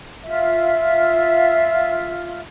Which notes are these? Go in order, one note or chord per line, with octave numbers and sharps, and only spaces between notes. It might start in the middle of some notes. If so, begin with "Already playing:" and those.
F4 E5